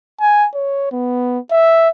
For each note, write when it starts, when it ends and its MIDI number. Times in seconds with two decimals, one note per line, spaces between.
0.20 0.47 80
0.55 0.92 73
0.92 1.39 59
1.52 1.89 76